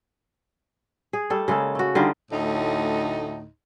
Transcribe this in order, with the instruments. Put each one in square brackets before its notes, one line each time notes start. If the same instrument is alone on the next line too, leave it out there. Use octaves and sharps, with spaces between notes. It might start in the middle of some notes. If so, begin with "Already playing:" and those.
[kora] G#4
G3 A3 A4
C#3 G#3 A#3 A4
A3 F#4
D3 G3 D#4 F4
[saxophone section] D2 A2 D#4